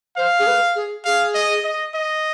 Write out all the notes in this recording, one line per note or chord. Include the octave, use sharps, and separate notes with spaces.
C5 F5
G#4
B4
G#4
G#4 F5
D#5
D#5
D#5